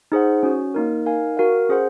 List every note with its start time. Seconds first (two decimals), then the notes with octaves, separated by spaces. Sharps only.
0.12 D#4 G#4 C5 F#5
0.43 C#4 F#4 C#5
0.74 A#3 D#4 A#4
1.06 D#4 A#4 F5 G#5
1.37 F#4 A#4 F5
1.69 C#4 G#4 C5 F#5